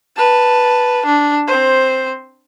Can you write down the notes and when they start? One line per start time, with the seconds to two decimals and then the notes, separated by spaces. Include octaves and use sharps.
0.17 B4 A5
1.06 D4
1.48 C4 C5